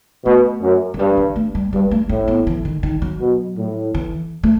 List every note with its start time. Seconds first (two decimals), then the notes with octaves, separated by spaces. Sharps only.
0.25 B2 A3
0.62 F#2
0.94 F#3
0.98 G2 G3
1.17 E3
1.36 A3
1.55 G3
1.73 G2 G3
1.91 A3
2.09 A2 C4
2.28 B3
2.47 E3
2.65 D#3
2.83 D#3
3.02 F#3
3.20 B2
3.57 A2
3.95 E3
4.43 A3